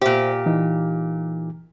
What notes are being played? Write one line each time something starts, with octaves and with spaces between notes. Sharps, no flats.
A#2 G4 C5 E5
E3 D#4